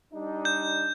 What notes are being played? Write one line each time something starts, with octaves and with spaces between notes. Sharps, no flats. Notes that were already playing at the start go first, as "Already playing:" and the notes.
G3 D4 D#4
G6